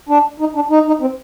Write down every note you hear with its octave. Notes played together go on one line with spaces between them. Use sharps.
D4
D#4
D4
D#4
D#4
C4